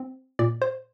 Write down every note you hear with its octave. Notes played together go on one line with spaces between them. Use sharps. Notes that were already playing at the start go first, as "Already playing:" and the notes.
Already playing: C4
A#2 D5
C5